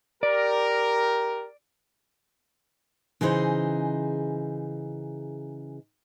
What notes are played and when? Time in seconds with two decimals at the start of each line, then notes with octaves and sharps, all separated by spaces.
0.23 G4 A#4 D5
3.21 C#3 E3 D#4 G#4 C5